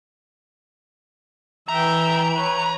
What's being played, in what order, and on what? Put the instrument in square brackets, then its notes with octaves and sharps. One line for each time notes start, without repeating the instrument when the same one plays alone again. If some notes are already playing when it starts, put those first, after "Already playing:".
[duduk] E3 [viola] E5 G5 [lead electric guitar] A#5
[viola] B4 C#5